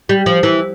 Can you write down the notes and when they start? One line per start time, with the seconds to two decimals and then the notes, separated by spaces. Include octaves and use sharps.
0.09 G3
0.26 F3
0.43 E3